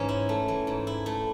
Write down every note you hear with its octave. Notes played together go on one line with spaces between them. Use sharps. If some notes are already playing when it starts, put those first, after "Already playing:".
Already playing: G#2 E3 C#4 C#5
E4
A3
E3
G#2
E4
A3